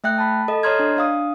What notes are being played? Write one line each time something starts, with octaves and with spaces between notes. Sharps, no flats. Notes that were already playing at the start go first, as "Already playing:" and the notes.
A3 E5 G5 F#6
A5 B5
A4 D#5
C#5 D#5 A#5 C6 F6 G#6
D4
D4 F5 D#6